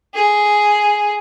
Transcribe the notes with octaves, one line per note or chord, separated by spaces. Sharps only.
G#4